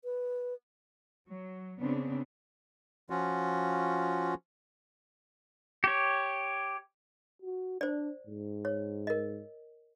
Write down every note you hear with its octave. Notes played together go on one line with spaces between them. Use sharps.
B4
F#3
C#3 B3 C4 D4
F3 C#4 F4 F#4
G4 C#5
F#4
D4 C5 D5
G#2
C#5
A#4 D#5